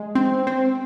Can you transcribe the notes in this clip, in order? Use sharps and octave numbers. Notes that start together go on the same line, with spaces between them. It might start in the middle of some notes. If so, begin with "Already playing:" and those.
Already playing: G#3
C4
C4